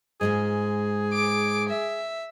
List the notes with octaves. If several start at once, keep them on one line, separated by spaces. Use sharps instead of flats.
G#2 G#3 F4 G#4
D6 D7
E5